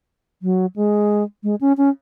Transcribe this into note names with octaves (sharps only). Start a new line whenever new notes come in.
F#3
G#3
G#3
C#4
C#4